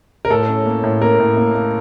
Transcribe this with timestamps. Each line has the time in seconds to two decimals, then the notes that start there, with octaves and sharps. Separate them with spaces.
0.25 A#4
0.30 A2 A4
0.48 C#4
0.66 A#3
0.84 A2
1.02 A#3 A#4
1.20 A2
1.37 A#3
1.55 A#3